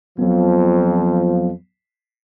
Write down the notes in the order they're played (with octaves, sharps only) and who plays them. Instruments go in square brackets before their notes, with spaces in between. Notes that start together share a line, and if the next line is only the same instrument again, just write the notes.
[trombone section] F2 F3 [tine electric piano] F#3 B3